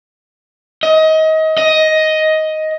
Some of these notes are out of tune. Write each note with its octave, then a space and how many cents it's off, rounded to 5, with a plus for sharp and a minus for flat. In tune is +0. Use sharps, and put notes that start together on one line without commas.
D#5 +25
D#5 +10